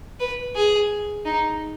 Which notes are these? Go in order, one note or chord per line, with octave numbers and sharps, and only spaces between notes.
B4
G#4
D#4